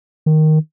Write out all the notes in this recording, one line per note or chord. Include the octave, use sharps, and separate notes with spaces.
D#3